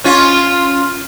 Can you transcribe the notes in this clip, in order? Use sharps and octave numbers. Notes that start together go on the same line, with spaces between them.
C#4 F4